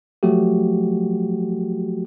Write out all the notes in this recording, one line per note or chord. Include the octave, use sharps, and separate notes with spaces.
F3 F#3 A3 F#4 G4